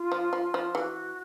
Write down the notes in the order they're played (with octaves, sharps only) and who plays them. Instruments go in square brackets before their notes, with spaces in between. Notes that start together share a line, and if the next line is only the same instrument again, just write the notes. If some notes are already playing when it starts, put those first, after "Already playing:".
Already playing: [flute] F4
[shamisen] F3
F3
F3
[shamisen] E3 [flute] G#4
[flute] F#4